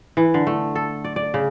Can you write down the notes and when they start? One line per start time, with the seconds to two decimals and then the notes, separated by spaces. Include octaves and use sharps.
0.17 E3
0.34 D3
0.47 A3
0.75 A4
1.04 D5
1.16 D5
1.34 C#3